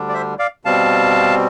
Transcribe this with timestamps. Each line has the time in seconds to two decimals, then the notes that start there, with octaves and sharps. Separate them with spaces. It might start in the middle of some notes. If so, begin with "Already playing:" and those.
Already playing: D2 D3 G3 D4
0.09 D5
0.14 C5 E5
0.39 D5 F5
0.65 B2 G3 C4 F5 A5